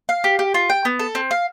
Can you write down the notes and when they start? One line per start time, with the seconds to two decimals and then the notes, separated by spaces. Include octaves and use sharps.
0.09 F5
0.24 G4
0.39 G4
0.54 F4
0.70 G5
0.85 B3
0.99 A4
1.15 C4
1.31 F5